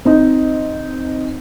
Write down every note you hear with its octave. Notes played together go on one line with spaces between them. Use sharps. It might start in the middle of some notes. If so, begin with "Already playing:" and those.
C4 D#4 D#5